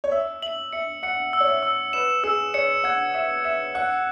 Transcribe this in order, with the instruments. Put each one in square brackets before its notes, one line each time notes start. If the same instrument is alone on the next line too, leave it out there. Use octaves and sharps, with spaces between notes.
[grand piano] C#5
[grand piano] E5 [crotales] E6
[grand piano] E5 [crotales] F#7
[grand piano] E5 [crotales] C#7
[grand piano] F#5 [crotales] C#7
[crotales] E6
[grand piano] C#5
E5
[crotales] E6
[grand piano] B4 [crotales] E7
[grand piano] G#4 [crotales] E6
[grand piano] C#5 [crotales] C#7
[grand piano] F#5 [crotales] G#6
[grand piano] E5 [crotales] E7
[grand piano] E5 [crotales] E7
[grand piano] F#5 [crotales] F#6